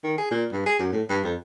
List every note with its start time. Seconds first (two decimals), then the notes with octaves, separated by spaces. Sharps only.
0.03 D#3
0.18 G#4
0.31 A#2
0.52 G2
0.66 G#4
0.79 F#2
0.92 A2
1.09 G2
1.24 F2